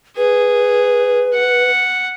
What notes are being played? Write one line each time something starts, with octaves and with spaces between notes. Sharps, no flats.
G#4 B4
F#5